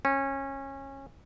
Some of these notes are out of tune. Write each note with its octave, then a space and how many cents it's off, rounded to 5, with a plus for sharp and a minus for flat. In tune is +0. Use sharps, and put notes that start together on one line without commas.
C#4 -20